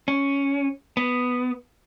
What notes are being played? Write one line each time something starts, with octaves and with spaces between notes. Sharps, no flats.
C#4
B3